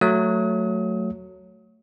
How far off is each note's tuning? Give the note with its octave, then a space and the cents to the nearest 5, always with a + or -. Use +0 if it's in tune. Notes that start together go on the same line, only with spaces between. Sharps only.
F#3 +0 A3 +15 D#6 +35